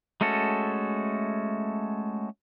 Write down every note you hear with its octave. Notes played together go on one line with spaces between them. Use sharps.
G#3 A3 C#4 F#4 A4